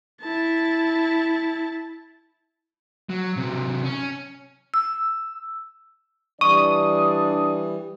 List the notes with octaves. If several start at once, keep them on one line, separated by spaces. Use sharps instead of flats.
E4 A5
F#3
C3 F#3
C#4
E6
E3 G3 D4 D5 C#6 D#6